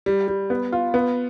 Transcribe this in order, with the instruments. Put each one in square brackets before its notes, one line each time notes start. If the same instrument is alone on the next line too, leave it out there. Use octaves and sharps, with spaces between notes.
[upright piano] G3
G3
B3
F4
B3